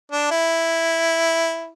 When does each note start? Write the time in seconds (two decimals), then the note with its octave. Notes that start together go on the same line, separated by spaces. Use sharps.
0.12 D4
0.31 E4